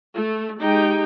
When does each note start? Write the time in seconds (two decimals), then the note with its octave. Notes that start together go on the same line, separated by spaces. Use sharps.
0.13 A3
0.59 G#3 D#4 G4 G5